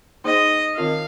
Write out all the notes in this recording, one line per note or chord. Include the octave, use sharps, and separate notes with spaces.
A#3 D#4 G#4 C5 D#5
D#3 C4 F4 A#4 D#5 F5